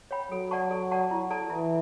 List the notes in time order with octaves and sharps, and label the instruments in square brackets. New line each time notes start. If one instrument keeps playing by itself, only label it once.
[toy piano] C#5 G5 B5
[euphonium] F#3 [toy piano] A4
[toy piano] D5 F#5 A5 C#6
A4
D5 F#5 A5 C#6
E4
A4 D5 A5
[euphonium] E3 [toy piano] E4